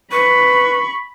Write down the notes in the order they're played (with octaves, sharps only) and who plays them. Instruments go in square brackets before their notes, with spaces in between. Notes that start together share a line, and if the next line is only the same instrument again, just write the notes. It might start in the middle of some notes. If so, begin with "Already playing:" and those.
[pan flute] B4 [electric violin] B5 [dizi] C#6